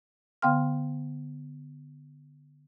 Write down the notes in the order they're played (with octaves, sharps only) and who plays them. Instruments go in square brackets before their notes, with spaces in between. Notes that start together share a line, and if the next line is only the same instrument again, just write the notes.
[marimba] D3 B3 F5 G5 C6 F6